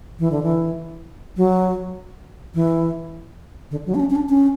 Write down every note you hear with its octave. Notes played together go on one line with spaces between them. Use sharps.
E3
D3
E3
F#3
E3
D3
F#3
D4
C#4
C#4
D4
C#4